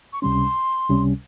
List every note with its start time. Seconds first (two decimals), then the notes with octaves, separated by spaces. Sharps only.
0.13 C#6
0.22 C#2 C3 G3 C#4 C6
0.89 C#2 C3 G3 C#4